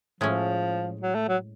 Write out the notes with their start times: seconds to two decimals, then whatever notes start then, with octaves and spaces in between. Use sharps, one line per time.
0.21 A2 F3 G#3 C#4
1.01 F#3
1.15 A3
1.28 F#3